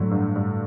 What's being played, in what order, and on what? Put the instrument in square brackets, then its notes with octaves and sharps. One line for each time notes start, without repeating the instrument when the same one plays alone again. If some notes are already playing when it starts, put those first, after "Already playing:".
Already playing: [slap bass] A2 [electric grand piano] D3 F#3 A3
[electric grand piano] G2
G2